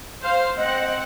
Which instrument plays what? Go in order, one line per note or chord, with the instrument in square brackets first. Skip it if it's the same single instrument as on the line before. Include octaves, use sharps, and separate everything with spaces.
[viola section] C5 F5
[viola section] C4 F#5 [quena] D#5